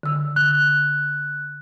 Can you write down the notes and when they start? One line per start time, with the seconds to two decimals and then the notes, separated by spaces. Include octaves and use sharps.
0.03 D3 E6
0.36 F#6